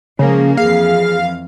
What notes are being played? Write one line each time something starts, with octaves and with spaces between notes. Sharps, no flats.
C#3 F3 G#3 A#3
F2 E3 G#4 F5